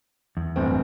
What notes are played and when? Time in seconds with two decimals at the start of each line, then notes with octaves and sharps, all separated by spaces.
0.37 E2
0.56 D1 G1 C4